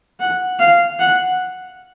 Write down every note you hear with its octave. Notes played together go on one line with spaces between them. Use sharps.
F#5
F5
F#5